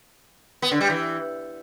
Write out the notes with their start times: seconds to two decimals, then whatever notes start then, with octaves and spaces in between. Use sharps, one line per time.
0.62 B3
0.71 D3
0.81 G3
0.90 E3